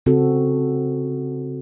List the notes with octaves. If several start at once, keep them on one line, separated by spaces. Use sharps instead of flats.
C#3 C4 F#4 A4